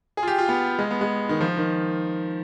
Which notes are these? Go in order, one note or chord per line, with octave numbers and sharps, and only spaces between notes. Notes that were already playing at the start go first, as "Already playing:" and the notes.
G#4
F4
G4
F4
B3
G#3
B3
G#3
D#3
F3
D#3